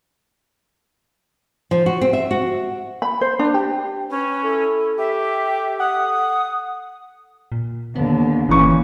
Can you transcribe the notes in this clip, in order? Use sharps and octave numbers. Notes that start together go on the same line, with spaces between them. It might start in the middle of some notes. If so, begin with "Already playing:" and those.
F3
F#4
C4
E5
F#4
B5
C5
D4
G4
C#4 B4
E4 A4
G4 E5
F#5 D#6
A#2
D#2 D3 B3
G1 A#2 E3 C#4 C#6